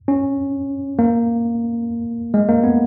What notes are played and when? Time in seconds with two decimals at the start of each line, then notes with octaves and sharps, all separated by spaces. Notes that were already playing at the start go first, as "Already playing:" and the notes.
0.08 C#4
0.99 A#3
2.34 G#3
2.49 A#3
2.64 B3